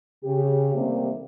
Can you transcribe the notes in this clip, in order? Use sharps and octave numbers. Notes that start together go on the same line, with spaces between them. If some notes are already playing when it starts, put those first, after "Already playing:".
C#3 G4
C3 D#3 G3 A3 A#3 C4